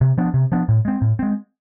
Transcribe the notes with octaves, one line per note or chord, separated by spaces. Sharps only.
C3
F3 B3 D4
C3
F3 B3 D4
A2
G#3 C4
A2
G#3 C4